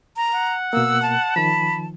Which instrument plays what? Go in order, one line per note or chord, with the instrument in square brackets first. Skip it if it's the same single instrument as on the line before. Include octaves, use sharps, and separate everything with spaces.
[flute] A#5
[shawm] F#5
[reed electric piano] B2 A#3 [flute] E6
[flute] A5
[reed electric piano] D#3 F3 [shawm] B5